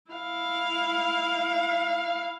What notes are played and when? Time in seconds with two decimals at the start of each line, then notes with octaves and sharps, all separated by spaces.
0.11 E4 F5